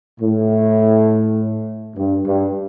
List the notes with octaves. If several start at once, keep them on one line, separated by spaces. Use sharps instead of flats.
A2
G2
G2